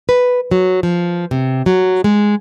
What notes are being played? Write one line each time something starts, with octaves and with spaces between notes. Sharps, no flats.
B4
F#3
F3
C3
F#3
G#3